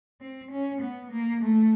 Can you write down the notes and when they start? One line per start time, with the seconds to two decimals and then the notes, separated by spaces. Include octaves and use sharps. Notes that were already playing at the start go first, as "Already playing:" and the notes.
0.21 C4
0.51 C#4
0.82 B3
1.11 A#3
1.42 A3